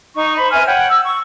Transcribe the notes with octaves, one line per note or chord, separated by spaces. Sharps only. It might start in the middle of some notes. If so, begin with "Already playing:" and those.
D#4 D#5 C#6
C5 B5
B4 E5 G#5 F6
C#5 F#5 G5
E6
C#6